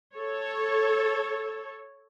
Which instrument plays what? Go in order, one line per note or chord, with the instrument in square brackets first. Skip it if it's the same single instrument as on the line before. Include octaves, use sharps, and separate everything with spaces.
[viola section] A4 C#5